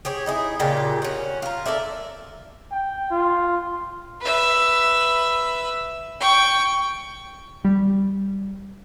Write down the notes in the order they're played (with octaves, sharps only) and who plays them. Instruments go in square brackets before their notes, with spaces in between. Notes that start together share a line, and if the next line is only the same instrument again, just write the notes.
[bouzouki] G4 G#4 C#5
D#4 E4 G#4
A#2 C#3 F4 G4
C#4 F#4
F4 A#4
A4 A#4 D5 E5
[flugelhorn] G5
F4
[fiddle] B4 E5
G5 C#6
[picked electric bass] G3